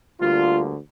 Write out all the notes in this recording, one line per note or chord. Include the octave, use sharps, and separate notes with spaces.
D2 D3 G3 A#3 F4